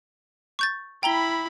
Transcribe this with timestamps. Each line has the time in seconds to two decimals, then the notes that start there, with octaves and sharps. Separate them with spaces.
0.59 C#6 G6 A6
1.03 E4 G5 A#5 B5 G7